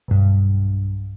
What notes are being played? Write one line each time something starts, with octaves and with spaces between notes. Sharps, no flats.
B1 G2